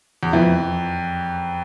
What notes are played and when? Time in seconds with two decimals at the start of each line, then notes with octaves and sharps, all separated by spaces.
0.23 E2
0.33 F2 F3 B3 E4